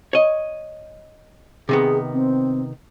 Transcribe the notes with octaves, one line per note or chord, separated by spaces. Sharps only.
C#5 D#5
C3 D#3 B3 G#4
C4